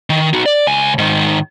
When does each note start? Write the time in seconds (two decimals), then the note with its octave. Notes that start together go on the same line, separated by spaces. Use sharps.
0.10 D#3
0.34 D#4 F#4
0.46 D5
0.67 C#2 G#5
0.98 G#2 D#3